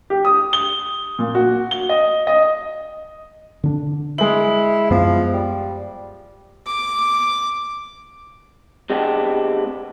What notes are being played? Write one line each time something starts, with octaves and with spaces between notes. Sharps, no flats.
G4
D#6
G7
A#2
F#4
G7
D#5
D#5
D3 D4
G#3 E4 F#7
F#2 F3 B3
G3
D6
C3 G#3 B3 D4 G4